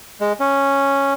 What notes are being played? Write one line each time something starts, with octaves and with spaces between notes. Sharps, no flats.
G#3
C#4